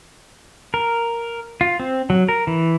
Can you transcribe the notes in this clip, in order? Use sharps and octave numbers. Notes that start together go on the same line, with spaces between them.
A#4
F4
C4
F#3
A#4
E3